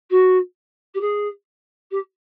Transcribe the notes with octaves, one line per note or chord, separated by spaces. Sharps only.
F#4
G4
G#4
G4